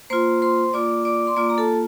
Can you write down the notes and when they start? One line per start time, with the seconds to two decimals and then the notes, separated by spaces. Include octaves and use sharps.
0.10 A#3 F4 C5 C6
0.42 C5 C6
0.73 A#3 F4 D5 D6
1.05 D5 D6
1.27 C6
1.36 A#3 F4 D5 D6
1.50 A#5
1.58 A4 A5